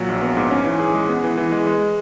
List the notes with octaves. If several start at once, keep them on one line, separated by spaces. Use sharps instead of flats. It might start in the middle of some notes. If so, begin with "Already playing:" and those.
Already playing: A#2 F#3
A#1
B3
G#2
C#4
E3
G#4
G#3
B3
E3
E3
G#3
G#3